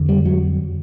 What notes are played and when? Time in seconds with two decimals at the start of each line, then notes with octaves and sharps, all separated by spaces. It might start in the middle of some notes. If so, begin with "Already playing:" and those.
Already playing: F2 D3
0.09 G3
0.26 F#3